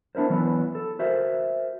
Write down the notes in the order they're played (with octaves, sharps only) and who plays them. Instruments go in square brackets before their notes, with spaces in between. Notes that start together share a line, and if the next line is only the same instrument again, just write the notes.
[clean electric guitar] B3 D4 E4 A#4 C5
E3 F#3 B3 E4 B4
A4
F#4 A#4 C5 E5